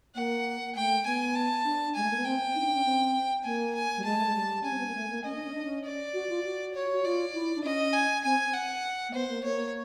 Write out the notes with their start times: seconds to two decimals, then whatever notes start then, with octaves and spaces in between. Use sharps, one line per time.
0.15 A#3 F#5
0.75 A3 G5
1.05 B3 G#5
1.34 A5
1.65 D4
1.95 G#3 G#5
2.03 A3
2.10 A#3
2.17 B3
2.25 C4 G5
2.55 D#4
2.60 C#4
2.65 D4
2.74 C#4
2.85 C4
3.44 A#3 G#5
3.75 G#5
3.97 G3
4.04 G#3 A5
4.17 A3
4.26 G#3
4.35 G3
4.63 C#4 G#5
4.71 C4
4.78 B3
4.87 A#3
4.95 A3
5.09 A#3
5.24 C#4 D#5
5.34 D4
5.44 C#4
5.54 D4
5.64 C#4
5.84 D5
6.14 F#4
6.29 F4
6.44 F#4
6.74 C#5
6.92 F#4
7.04 F4 D5
7.34 E4
7.56 D4
7.64 C#4 D#5
7.93 G#5
8.24 C4 G#5
8.53 F#5
9.09 A#3
9.14 B3 C5
9.29 A#3
9.43 A#3 C#5